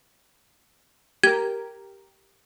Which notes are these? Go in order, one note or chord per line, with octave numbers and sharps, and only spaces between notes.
G4 A#4 G#6